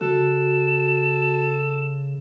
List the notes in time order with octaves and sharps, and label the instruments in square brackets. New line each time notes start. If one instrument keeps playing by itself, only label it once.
[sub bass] C#3 [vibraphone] F#4 [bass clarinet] A4 [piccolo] E7